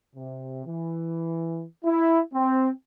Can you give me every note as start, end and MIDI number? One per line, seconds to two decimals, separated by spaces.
0.15 0.65 48
0.66 1.64 52
1.84 2.20 64
2.34 2.68 60